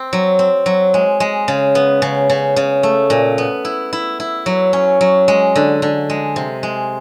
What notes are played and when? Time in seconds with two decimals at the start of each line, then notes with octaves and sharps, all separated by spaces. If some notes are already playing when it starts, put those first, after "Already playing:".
Already playing: C4
0.13 F#3
0.39 C4
0.66 F#3
0.94 G#3
1.20 G#3
1.48 C#3
1.75 B3
2.02 C#3
2.30 C#3
2.56 C#3
2.83 A3
3.10 A#2
3.38 B3
3.65 E4
3.93 E4
4.20 E4
4.46 F#3
4.73 C#4
5.01 F#3
5.28 G#3
5.55 D3
5.82 D3
6.10 G#3
6.36 C3
6.63 G#3